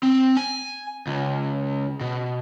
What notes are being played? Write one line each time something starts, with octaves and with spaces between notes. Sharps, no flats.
C4
G#5
C#2
B2